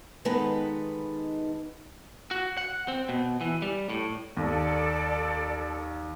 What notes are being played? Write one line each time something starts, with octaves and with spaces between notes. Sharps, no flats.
D#3 G#3 B3 D#4 A4 B4
F#4
F#5
C4
B2
E3
G3
A2
D#2 A4 D5